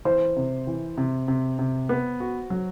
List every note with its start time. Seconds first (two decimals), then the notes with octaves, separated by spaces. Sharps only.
0.05 E3 C5
0.36 C3
0.67 E3
0.97 C3
1.28 C3
1.59 C3
1.89 B3
2.20 F#4
2.50 F#3